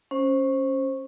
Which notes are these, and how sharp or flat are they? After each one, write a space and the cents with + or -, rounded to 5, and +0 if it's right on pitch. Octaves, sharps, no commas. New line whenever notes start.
C#4 -10 C5 +15